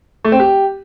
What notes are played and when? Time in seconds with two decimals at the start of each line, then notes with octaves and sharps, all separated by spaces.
0.25 A3
0.32 C4
0.40 G4